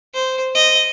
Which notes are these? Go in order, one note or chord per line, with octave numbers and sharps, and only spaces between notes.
C5
D#5